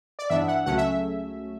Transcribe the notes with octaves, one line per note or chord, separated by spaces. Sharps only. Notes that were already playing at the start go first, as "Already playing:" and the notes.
D5
G2 E3 B3 D4 E5
F#5
C#2 C#3 F#3 A3 C#4 F#5
E5